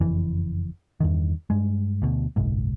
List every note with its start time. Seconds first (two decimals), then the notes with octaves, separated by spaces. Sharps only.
0.01 F#1 F2 E3
1.00 E2 G2 D#3
1.50 G2 G#3
2.02 D2 B2
2.36 F#1 B1 G#2